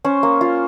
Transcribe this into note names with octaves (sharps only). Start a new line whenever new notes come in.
C#4 C5
A#3
F4